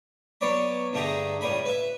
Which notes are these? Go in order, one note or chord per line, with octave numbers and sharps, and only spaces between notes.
F#3 B3 C#5 D5 B5
G2 D3 A3 G4 G#4 A#5
C#2 A2 G3 G#5 B5
B4 E5